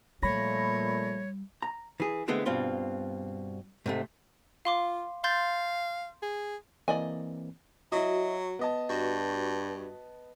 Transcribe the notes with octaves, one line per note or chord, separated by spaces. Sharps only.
A#2 F3 G3 A3 C#5 B5 A#6
A#5
E3 G#4
D3 E3 G#3 A3 B3 C4
G2 B2 C4 F4
G#2 C3 A3
F4 F5 C6 D6
F5 C6 G6 A6
G#4
E3 A#3 C4 D5 D#5 G#5
F#3 E4 F#4 D#5
B3 D#5 A5
G2 F#4